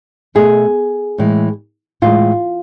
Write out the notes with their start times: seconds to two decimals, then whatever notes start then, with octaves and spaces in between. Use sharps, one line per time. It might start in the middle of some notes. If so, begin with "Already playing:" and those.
0.35 B2 A3 G#4
1.18 A2 E3 G#3
2.02 A2 E3 G#3 F4